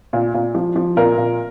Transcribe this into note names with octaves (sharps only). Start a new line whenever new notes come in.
A#2
A#2
F3
F3
A#2 A#4
A#2